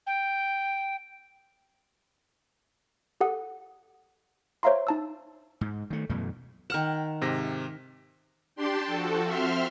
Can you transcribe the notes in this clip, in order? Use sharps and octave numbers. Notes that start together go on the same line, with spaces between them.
G5
G4 A4 F#5 D#6
C5 C#5 E5 F5 A#5 C6
D#4 A5 E6
G#2
D#3 A3
F#2 B2 E3 A3
D#3 F#5 G5 F6 E7
G#2 C3 A#6
D4 G4 G5 A5 C6
F3 F#4 A4
C4 E5 C6 F6